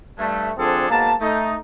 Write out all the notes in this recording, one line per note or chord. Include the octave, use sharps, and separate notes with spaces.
G2 A3
D3 F3 C4 D4 G#4 A4
G#2 B2 A#3 A5
A3 D#4